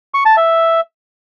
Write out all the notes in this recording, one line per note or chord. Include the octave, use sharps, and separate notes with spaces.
C#6
A5
E5